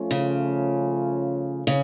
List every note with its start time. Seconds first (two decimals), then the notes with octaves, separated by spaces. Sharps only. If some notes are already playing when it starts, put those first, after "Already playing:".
Already playing: F3 A3 C#4 F4
0.11 C#3
1.67 C#3